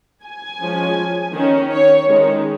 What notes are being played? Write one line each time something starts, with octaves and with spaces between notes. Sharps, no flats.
G#5
F3 G#3 C#4
D#3 C#4
C#5
D#3 G#3 C#4